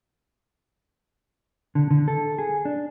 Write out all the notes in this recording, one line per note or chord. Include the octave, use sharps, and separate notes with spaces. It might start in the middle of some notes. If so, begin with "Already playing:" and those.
D3
D3
A4
G#4
D4